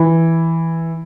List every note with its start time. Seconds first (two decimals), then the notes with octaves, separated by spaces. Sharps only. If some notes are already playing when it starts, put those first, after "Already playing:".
Already playing: E3